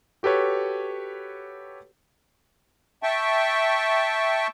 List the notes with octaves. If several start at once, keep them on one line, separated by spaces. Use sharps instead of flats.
F#4 G4 A4 B4 C#5
E5 G5 A5 C#6